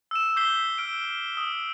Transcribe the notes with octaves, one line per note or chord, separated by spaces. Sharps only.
E6 E7
D6 E6 G6 B6 C7 G7
E6 F6 D7
D#6